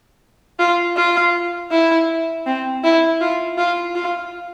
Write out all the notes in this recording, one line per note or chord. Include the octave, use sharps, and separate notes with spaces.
F4
F4
E4
C4
E4
F4
F4
F4